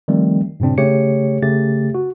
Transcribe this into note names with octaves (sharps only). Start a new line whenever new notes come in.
D#3 F3 G3 A3 C4
G2 A#2 C#3 C4 D4
C#3 A3 G4 C#5 C#7
C#3 A3 G4 A6
F#4